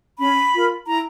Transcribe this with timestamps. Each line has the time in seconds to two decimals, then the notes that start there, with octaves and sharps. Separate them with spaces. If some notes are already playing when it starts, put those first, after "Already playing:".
0.20 C#4 B5
0.54 F4 A#4
0.87 E4 A#5